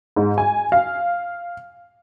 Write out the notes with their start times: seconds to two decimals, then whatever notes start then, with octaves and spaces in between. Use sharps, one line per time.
0.16 G#2
0.38 G#5
0.72 F5